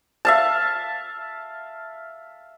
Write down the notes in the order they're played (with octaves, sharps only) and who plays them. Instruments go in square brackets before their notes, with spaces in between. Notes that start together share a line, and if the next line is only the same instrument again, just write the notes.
[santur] E5 F5 A5